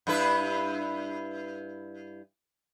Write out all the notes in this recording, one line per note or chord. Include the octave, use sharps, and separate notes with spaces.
G2 E4 B4